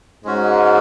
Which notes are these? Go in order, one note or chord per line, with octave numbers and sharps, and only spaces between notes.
G#2 G#3 C#4 F#4